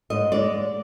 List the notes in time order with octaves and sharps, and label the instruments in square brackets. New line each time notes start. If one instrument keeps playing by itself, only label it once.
[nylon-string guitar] G#2 D#5
G#3 D5